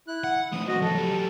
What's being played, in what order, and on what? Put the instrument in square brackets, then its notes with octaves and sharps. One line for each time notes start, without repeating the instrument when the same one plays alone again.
[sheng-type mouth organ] E4 F#6
[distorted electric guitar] F#5
[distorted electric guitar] A2 F3 [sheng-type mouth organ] D#6
[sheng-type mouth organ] F#4 D#5
[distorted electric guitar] A2 F3 [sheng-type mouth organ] A4
[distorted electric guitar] F#3 G4